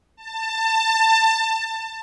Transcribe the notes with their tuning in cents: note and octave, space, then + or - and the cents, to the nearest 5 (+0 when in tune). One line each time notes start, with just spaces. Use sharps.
A5 +25